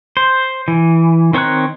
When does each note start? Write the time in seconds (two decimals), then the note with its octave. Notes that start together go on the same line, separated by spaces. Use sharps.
0.17 C5
0.68 E3
1.33 D#3 C4 C#5 A#5 F#6